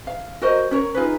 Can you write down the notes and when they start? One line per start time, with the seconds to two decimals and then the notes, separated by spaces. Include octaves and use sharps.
0.07 F5
0.42 F#4 A#4 C5 D#5
0.71 C#4 A#4 C#5
0.94 D#4 F4 G#4 B4